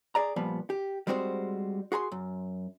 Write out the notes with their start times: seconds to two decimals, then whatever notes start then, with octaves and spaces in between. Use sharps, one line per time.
0.15 G#4 D5 A#5
0.36 A#2 F3 G3 B3
0.70 G4
1.07 G3 G#3 C4 F#4 G#4 C5
1.92 F#4 G#4 A#5 C6
2.12 F#2